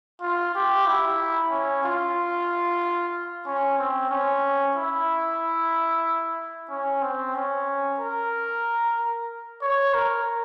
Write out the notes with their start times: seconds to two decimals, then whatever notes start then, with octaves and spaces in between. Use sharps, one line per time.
0.21 F4
0.55 G4
0.87 E4
1.51 C#4
1.84 F4
3.46 C#4
3.78 C4
4.10 C#4
4.76 E4
6.69 C#4
7.02 C4
7.34 C#4
8.00 A#4
9.62 C#5
9.94 A#4